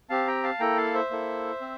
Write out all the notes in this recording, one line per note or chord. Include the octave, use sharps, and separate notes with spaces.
C4 G4 F5 A5
G5 A#5
F5 A5
A#3 E4 A4 G5 A#5
F5 A5
C5 E5
A#3 E4 A4
C4